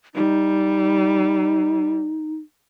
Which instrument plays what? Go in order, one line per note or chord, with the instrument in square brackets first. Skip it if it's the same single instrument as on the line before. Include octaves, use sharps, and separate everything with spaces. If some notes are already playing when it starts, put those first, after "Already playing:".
[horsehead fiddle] G3 [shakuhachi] D#4